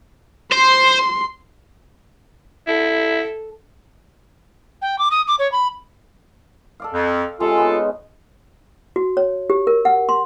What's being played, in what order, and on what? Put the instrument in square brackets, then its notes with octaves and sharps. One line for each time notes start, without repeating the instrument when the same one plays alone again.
[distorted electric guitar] C5 [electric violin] C6
[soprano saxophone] E4 [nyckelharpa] A4
[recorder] G5
D6
D#6
D6
C#5
B5
[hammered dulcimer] A4 D5 F5
[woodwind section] F2
[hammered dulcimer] C3 G#3 C#4 [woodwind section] F4 A4
[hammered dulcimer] B3 C#4 D#4
[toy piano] F#4
C#5
G4
A#4
F#5
C6